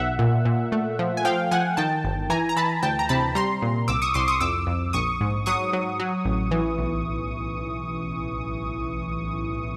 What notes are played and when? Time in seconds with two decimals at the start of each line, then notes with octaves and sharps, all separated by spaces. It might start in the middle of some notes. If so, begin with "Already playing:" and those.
Already playing: B1 E5 F#5
0.19 A#2
0.45 A#2
0.72 A3
0.99 F3
1.17 G#5
1.25 F3 F5 G5
1.51 F3 F#5 G#5
1.77 D#3 G5 A5
2.04 G1
2.30 E3 G#5 A#5
2.49 A#5
2.57 E3 A5 B5
2.82 D2 G5 A5
2.99 A#5
3.09 C3 A5 B5
3.35 G3 A#5 C6
3.62 A#2
3.88 C2 D6 E6
4.02 C#6 D#6
4.14 C2 C6 D6
4.28 C#6 D#6
4.40 F2 D6 E6
4.67 F2
4.93 A#1 C#6 D#6
5.21 G#2
5.46 F#3 C#6 D#6
5.73 F#3
6.00 F#3
6.25 A1
6.51 E3
6.78 B1